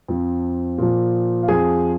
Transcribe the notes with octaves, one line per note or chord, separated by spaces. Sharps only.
F2 F3
A#2 F3
F5
F2 F3 G#4 G#5